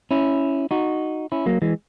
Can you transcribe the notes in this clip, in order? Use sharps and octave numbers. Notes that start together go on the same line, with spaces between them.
C#4 E4
D#4 F#4
C#4 E4
F#3 A#3
E3 G#3